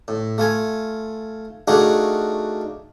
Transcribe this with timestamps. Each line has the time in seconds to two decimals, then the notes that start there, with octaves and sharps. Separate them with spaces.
0.08 A2
0.38 A3 F4 G#5
1.68 A3 D4 D#4 F4 F#4 G#4